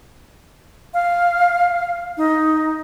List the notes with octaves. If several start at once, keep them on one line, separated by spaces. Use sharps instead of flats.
F5
D#4